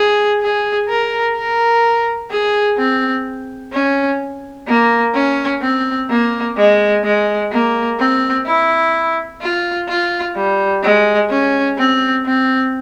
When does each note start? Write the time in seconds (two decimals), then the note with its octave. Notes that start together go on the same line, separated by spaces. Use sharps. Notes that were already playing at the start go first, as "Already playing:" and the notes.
Already playing: G#4
0.41 G#4
0.89 A#4
1.36 A#4
2.31 G#4
2.78 C4
3.73 C#4
4.67 A#3
5.14 C#4
5.62 C4
6.10 A#3
6.57 G#3
7.04 G#3
7.52 A#3
7.99 C4
8.46 E4
9.41 F4
9.89 F4
10.36 G3
10.83 G#3
11.30 C#4
11.78 C4
12.25 C4